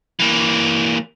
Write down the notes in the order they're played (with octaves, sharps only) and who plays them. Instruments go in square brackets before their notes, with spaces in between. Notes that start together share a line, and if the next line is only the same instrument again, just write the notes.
[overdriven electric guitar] E3 A#3